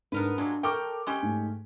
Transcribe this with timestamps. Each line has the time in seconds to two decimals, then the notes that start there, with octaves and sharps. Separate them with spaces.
0.12 G#2 B3 D4 A#4 B4
0.38 A#2 F#3 G#3 D4
0.63 A4 A#4 G5 C#6 D6
1.07 G#3 C#4 G4
1.23 G#2 A3